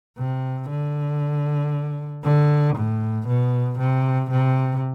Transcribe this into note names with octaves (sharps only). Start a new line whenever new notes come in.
C3
D3
D3
A2
B2
C3
C3